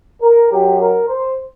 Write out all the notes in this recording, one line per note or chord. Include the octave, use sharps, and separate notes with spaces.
A#4
F#2 F#3 G4
A#4
C5